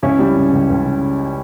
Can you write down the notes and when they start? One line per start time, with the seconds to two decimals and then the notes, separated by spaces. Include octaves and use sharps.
0.02 C#2 C#4 E4
0.19 G3
0.36 C#3
0.53 C#2
0.70 C#2
0.86 C#3